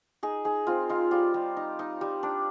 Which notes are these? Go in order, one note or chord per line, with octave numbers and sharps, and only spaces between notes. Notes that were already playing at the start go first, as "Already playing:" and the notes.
D#4 G#4
D#4 G#4
C4 F4
D#4 F4
G3 F4
G3
D#4
D#4
G3
D4